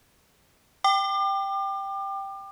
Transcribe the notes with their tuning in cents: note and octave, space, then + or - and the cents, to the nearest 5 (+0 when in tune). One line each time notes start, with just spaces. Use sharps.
G5 +0 D6 +35